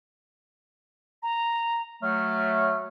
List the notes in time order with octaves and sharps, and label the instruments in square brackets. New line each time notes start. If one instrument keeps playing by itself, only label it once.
[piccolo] A#5
[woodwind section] F#3 A3 [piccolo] F6